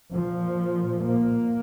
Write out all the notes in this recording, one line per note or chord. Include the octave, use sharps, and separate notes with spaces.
A#2 F3
A#3